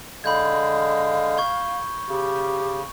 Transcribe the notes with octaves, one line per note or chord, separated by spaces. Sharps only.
D3 G#3 F5 B5 G6 G#6
C#6 G#6 G7
C#3 G4